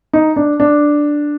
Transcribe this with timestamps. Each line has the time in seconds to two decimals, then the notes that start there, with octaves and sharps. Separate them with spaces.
0.13 D#4
0.36 D4
0.60 D4